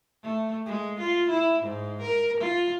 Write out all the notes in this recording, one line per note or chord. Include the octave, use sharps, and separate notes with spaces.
A3
G#3
F4
E4
G#2
A#4
F4